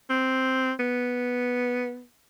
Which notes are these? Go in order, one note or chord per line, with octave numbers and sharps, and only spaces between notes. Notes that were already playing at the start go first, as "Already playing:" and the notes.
C4
B3